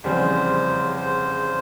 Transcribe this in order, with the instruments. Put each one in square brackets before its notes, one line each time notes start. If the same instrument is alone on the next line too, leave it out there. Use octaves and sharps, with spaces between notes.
[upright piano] F1 E2 C#3 G3 C4 [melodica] C5
[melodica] C5